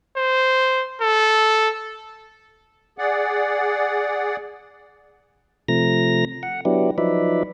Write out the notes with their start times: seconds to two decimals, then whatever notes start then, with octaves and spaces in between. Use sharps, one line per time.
0.17 C5
1.01 A4
2.98 G#4 D5 F#5
5.68 C3 F3 A3 A#5 A#6
6.43 F#5
6.65 F#3 B3 D4 E4 G4
6.98 F3 F#3 D#4 B4 D5 E5